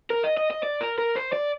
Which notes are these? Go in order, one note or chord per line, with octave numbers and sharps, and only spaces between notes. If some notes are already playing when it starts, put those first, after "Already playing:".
A#4
D#5
D#5
D#5
D5
A#4
A#4
C5
D5